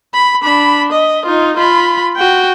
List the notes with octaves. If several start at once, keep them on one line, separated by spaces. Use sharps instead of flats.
B5
D4 B5
D#5
D#4 F4
F4 B5
F#4 G5